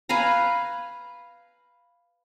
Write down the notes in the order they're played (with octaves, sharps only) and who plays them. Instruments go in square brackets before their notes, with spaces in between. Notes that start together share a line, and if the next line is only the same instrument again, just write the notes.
[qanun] B4 F5 G#5 A#5